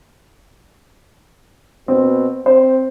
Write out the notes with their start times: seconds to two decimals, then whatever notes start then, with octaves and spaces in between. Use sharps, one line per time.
1.88 B2 C4
2.46 C4 C5